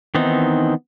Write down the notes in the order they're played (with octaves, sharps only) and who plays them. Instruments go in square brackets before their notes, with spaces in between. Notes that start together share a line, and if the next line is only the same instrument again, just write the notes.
[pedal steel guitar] D#3 E3 B3 C4 D#4